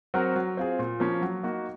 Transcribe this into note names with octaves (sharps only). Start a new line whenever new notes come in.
F#3 C4 F#4 A#4
F#3
C4 F4 G#4
A#2
F3 A#3 C#4
F#3
A#3 D#4 F#4